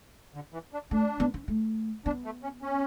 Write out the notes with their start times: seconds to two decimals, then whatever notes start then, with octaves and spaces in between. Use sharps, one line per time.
0.34 D3
0.53 E3
0.73 D4
0.91 A3 D4
1.20 B3
1.34 C#4
1.48 A3
2.06 B3 D4
2.25 A3
2.43 C#4
2.62 C#4